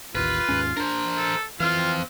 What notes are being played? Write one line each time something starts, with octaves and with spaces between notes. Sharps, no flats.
A1 D#2 F4 B4
D#2 G#2 C#4
D4 A#4 C5
A4
E3 C4 F4 F5